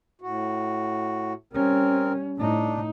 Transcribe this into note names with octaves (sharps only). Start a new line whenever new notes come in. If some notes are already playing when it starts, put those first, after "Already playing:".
A2 F#4
G3 C4 C#4 A#4
A2 D4 D#4